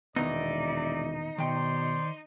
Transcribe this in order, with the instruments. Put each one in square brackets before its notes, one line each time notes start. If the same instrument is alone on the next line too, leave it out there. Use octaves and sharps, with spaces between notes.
[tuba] E1 [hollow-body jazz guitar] A#2 D#3 B3 [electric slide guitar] D#4 [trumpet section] D5 E5
[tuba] B2 [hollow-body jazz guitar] D#3 G5 [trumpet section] C5 D5 C6